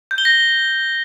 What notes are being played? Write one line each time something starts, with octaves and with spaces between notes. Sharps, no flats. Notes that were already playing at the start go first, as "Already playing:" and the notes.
G6
G7
A#6